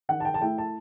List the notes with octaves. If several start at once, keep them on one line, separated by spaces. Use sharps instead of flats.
D#3 F#5
A5
G5
A5
A3 E4 G5
A5